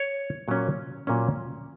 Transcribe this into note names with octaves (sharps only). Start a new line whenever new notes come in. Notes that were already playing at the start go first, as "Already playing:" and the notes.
Already playing: C#5
A#2 F#3 A#3 C#4
A#2 F#3 A#3 C#4